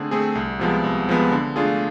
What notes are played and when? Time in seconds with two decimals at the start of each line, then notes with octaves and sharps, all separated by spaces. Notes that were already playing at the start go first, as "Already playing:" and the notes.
Already playing: D3 A3 C4 G#4
0.11 A3 C4 G#4
0.35 C2
0.59 C3 F3 G#3 B3
0.84 C2
1.08 C3 F3 G#3 B3
1.31 D3
1.56 A3 D4 F4 G#4